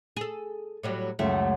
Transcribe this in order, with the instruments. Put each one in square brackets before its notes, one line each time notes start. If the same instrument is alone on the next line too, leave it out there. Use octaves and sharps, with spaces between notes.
[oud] G#4 A4
A2 F#3 G3
[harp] C#2 F#2 [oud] A3